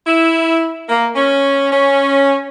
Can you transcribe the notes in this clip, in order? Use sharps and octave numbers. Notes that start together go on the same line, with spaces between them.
E4
A#3
C#4
C#4